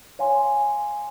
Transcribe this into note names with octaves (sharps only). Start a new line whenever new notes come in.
C#5 F5 G#5 C6